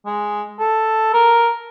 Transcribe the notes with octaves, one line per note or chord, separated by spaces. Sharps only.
G#3
A4
A#4